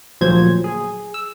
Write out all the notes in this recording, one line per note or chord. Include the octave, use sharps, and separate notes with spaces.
D2 A#2 F3 F#3 C5 G#6
G#4
E6